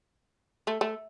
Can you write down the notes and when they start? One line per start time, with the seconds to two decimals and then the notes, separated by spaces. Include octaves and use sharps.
0.67 A3
0.81 A3